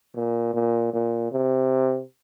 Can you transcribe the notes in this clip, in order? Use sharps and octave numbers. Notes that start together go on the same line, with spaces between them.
A#2
A#2
A#2
C3